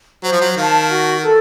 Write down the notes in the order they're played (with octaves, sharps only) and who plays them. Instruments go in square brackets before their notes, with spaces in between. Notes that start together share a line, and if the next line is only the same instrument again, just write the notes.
[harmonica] F#3 [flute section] C5
[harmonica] F3
F#3
[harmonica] D#3 [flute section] F5 A5
[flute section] F#4
A4